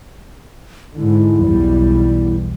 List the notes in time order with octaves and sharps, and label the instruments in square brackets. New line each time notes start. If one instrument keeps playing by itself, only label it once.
[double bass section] G#2 D3 [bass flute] E4
[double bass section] B1 E2 G3